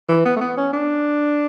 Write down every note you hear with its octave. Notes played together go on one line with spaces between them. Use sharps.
E3
B3
A3
B3
C#4
D4